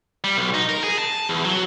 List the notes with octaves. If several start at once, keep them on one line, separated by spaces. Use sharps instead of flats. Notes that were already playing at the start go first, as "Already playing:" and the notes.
G3
B1
D#4
A#4
G#4
A5
E2
F#3